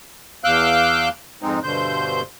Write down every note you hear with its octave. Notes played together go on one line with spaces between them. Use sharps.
E2 F5 D6 E6 F#6 G6
F2 G#2 G#3 C4 D#4
G2 B2 D3 C5 G6